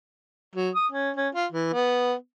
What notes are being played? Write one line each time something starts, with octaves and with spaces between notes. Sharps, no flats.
F#3
D#6
C#4
C#4
F4
E3
B3